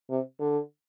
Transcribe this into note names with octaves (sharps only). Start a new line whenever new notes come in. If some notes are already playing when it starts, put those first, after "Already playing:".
C3
D3